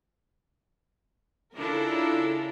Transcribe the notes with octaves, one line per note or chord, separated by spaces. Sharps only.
C#3 D4 E4 F4 A4 A#4